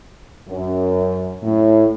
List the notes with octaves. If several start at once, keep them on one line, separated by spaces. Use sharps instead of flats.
F#2
A2